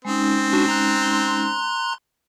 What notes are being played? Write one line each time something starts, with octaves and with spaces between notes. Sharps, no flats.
G#3 C4 C#4 D#4
D4 F#4
A#5 C6 F#6